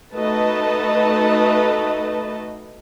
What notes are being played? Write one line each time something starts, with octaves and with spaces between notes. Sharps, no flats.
A3 D#4 F#4 B4 D#5 A5